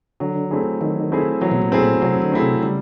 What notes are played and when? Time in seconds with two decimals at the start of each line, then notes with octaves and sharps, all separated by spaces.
0.20 D3 F#3
0.51 A3 C4 E4 G#4
0.81 D#3 F#3
1.12 A3 C4 E4 G#4
1.41 E3 F#3
1.51 B2
1.62 A#2
1.72 A3 C4 E4 G#4
1.82 A#2
2.02 C3 F#3
2.22 D3
2.32 A3 C4 E4 G#4
2.42 C3
2.63 C#3 G3